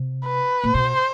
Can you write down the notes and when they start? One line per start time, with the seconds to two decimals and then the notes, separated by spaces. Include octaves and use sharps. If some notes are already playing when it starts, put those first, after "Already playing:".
Already playing: C3
0.25 B4
0.64 A#2
0.74 B2 C5